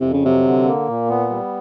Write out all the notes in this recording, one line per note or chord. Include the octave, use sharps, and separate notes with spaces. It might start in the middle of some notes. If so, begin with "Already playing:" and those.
F2 C3
C#3
C3 F#3
D3
A#3
A#2
B3
G3